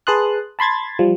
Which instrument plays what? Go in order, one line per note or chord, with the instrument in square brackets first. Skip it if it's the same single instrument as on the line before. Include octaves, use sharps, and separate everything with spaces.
[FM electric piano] G#4 B4 A5 C6 D#6 F#6
A5 B5 C6 G#6 A6
F3 G3